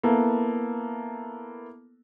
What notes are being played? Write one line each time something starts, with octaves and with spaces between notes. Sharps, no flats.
A#3 B3 E4 A4